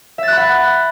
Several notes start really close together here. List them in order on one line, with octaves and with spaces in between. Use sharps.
E5 A6 F#6 B5 F#5